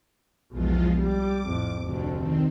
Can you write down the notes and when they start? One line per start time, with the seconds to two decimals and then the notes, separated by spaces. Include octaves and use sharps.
0.52 B1 E2 F3 G#3 F4
0.99 G3 D6
1.45 F2 A2
1.82 F1 D2 D3
2.14 D#3 C4